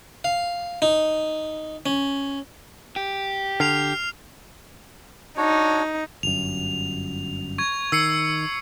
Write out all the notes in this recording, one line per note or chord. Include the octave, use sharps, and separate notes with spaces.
F5
D#4
C#4
G4
D3 F6 C7 F7
D4 D#4 F#4 C#5
G1 F#2 F7
C#6 G#6
D#3 E6 C7 C#7